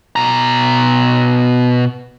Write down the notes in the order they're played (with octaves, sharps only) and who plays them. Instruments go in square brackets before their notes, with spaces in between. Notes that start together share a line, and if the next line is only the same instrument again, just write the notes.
[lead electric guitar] B2 A#5